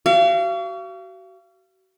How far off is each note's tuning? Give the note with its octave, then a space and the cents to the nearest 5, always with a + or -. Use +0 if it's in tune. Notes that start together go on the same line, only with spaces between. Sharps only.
F#4 +35 F5 -35